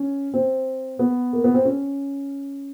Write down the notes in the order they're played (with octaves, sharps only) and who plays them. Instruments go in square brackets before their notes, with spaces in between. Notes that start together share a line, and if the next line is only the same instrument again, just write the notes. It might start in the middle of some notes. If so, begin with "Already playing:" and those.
Already playing: [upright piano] C#4
C4
B3
A#3
B3
C4
C#4